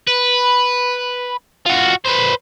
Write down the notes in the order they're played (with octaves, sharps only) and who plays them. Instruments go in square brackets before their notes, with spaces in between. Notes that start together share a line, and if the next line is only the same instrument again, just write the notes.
[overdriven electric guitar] B4
F4 F#4
B4 C5